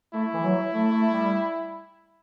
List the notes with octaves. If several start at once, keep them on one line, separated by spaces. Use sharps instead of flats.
A3 E4
E3
F#3
A3
A3
G3